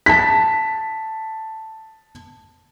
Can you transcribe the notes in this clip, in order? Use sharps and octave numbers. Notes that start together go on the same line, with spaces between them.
A5 B6